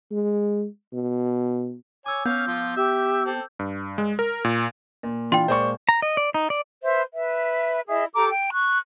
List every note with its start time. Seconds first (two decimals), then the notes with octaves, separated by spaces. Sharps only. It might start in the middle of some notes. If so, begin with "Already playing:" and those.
0.11 G#3
0.93 B2
2.06 C#5 G#5 D6 E6
2.26 B3 C#4 F5 G6
2.47 F3 F4
2.77 G4 E5 E6
3.26 C4 A4
3.59 G2
3.98 G#3
4.19 A#4
4.44 A#2
5.03 A#2
5.32 E3 D4 F4 G5 C6
5.48 A#2 G#3 A#3 C5 D5 C#6
5.89 A#5
6.02 D#5
6.17 D5
6.34 D#4
6.50 D5
6.83 B4 C5 E5
7.14 B4 E5
7.88 E4 G#4 D#5 E5
8.14 G4 A4 A#5 D6
8.29 G5
8.52 C#6 F#6